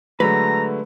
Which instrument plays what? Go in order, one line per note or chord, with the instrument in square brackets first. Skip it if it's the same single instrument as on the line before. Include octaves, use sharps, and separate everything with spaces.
[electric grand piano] D3 A3 [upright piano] F#3 G#3 [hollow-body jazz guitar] B4 [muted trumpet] A#5